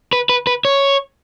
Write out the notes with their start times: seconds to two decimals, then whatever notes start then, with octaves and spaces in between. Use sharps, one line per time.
0.13 B4
0.29 B4
0.47 B4
0.65 C#5